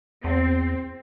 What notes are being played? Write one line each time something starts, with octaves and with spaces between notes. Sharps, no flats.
E2 C4